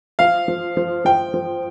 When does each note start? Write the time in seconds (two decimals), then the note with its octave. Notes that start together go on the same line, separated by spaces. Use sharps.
0.19 F3 F5
0.48 F3
0.77 F3
1.05 F3 G5
1.34 F3